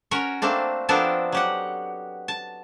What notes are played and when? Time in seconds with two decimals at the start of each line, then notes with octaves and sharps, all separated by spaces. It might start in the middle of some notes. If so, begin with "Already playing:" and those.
0.11 C#4 F#4 A#4 C#5
0.42 A3 A#3 C4 D4
0.89 F3 B3 C4 D4 A4 A#4
1.32 F#3 G4 F#5
2.28 A5